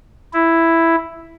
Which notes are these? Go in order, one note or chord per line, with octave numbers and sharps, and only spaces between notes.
E4